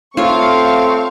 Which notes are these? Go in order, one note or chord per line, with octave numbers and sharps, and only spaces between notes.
A3 C4 F4 C#5 F5 C#6